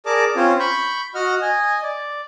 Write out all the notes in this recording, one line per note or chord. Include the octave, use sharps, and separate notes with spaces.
G#4 A#4 D5 A5 D6
C4 C#4 F4 C5 C#5
B5 C#6 G6
F#4 D#5 F#5 F6
D#5 G#5
D5